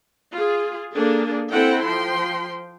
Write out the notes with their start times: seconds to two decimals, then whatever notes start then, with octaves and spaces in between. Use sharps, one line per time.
0.33 F4 G#4
0.93 A#3 D4 G#4 A4
1.51 C4 E4 A4 F#5 G5
1.84 F3 G5 C6